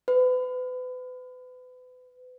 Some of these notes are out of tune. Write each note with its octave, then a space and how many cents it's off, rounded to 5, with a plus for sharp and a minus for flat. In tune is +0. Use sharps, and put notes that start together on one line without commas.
B4 +35